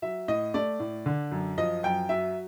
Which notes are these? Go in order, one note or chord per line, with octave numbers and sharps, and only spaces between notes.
F#3 E5
A2 D#5
A3 D5
A2
D3
F#2
F3 D#5
F#2 G5
F#3 E5